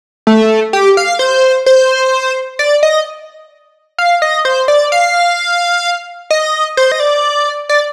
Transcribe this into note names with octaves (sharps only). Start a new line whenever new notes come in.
A3
G4
F5
C5
C5
D5
D#5
F5
D#5
C5
D5
F5
D#5
C5
D#5
D5
D5